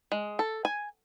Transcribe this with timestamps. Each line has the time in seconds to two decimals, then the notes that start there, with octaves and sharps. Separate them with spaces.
0.12 G#3
0.39 A4
0.65 G#5